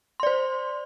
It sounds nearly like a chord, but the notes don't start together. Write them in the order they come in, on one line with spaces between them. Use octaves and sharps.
C6 D5 C5